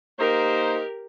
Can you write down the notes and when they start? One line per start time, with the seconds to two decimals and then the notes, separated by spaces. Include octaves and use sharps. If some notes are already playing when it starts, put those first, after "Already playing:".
0.19 A#3 D#4 G4 A#4 C5